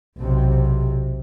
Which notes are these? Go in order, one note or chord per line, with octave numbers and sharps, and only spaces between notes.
B1 C3